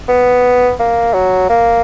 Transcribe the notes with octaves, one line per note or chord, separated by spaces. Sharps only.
B3
A#3
F#3
A#3